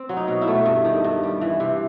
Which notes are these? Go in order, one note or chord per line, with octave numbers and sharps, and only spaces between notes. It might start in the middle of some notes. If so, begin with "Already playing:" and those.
Already playing: C4
F#3
D#4
B2
E4
A3
G2
D#3
G2
G3
E3
C3